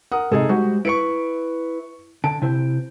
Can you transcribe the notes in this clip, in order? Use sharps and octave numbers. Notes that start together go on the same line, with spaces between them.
A#4 F#5 D#6
G#2 C3 D#4 G#4 A4
G3 G#3 F#4 C5
E4 B4 C#6 C#7 D7
D3 A5 D7
C3 E4 C5